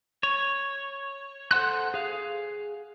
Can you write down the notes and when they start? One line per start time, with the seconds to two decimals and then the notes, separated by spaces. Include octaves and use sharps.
0.23 C#5
1.51 A4 C5 F#5 C6 F#6
1.94 G#4 F5